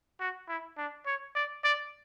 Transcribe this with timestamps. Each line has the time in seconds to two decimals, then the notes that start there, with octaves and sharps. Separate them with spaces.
0.20 F#4
0.48 E4
0.78 D4
1.06 C#5
1.35 D5
1.64 D5